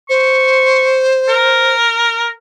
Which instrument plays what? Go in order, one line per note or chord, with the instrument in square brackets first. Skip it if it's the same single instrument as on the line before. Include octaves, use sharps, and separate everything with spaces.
[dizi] C5 [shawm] C#6
[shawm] A#4